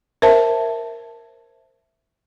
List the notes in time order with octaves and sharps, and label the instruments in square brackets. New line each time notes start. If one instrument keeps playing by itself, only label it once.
[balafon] A#4 C5 E5 A5